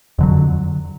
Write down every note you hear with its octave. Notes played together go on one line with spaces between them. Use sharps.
F2 D3 F#3